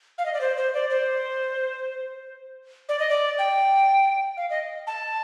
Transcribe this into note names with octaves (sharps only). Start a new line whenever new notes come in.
F5
D#5
D5
C5
C5
D5
C5
D5
D#5
D5
G5
F5
D#5
A5